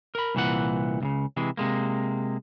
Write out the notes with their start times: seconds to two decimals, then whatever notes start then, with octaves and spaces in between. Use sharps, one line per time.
0.15 A#4 B5
0.35 C2 A#2 E3 F#5
1.00 C#2 A#2 C#3
1.37 C3 E3 G#3
1.57 C3 G#3 A#3